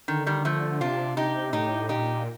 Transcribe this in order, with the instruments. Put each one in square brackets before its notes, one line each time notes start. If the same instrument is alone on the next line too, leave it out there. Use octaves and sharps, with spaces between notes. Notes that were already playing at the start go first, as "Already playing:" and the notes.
[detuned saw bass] D3 [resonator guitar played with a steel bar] D#3
[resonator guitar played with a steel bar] D#3 G3
F3 A3
[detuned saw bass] C3 [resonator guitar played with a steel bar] D4 F4
[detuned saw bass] C3 [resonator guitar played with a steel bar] D#4 G4
[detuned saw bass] A2 [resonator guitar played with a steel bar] D#4 G4
[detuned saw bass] A#2 [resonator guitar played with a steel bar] D#4 G4